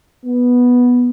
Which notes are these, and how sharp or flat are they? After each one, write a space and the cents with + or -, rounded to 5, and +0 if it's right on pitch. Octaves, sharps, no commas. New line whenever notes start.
B3 -5